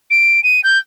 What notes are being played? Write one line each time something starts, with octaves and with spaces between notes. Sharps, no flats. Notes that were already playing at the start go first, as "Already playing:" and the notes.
D7
D#7
G6